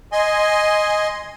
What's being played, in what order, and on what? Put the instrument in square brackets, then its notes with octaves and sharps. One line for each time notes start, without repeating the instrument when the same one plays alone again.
[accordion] D#5 G#5 C6